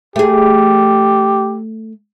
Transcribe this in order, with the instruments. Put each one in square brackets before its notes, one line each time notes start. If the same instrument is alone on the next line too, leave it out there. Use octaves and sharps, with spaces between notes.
[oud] A3 G#4 [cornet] G4